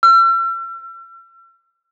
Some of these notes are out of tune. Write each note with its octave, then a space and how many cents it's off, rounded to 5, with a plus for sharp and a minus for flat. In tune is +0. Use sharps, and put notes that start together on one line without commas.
E6 +45